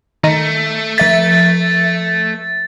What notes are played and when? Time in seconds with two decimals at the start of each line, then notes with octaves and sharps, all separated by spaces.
0.24 D#3 A3
0.98 F3 E5 A6 B6